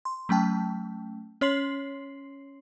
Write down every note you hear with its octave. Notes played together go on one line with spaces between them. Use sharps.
C6
F#3 A3 C#4 G5 A5
C#4 C#5 C6 C7 F#7